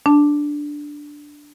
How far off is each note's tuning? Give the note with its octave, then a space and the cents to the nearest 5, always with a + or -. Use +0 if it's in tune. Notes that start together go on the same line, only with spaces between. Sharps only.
D4 +0 A5 +0